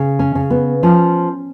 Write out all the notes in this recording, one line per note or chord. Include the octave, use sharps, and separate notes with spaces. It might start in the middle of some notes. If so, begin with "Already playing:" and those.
Already playing: C#3
C#4
C#3
B3
F3 C#4